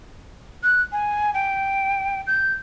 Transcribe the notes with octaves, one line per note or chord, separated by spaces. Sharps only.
F#6
G#5
G5
G6